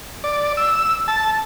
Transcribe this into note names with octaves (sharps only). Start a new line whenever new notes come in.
D5
E6
A5